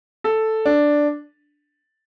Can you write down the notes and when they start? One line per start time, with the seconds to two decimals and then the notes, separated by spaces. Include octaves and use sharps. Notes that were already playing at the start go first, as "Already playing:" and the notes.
0.24 A4
0.65 D4